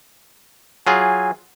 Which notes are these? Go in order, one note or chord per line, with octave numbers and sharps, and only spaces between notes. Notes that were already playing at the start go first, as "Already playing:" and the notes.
F#3 F4 G#4 G#5